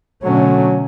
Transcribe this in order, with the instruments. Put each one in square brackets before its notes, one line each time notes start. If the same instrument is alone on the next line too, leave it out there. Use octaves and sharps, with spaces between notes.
[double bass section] B2 D3 A3 [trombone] F#3 [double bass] C#4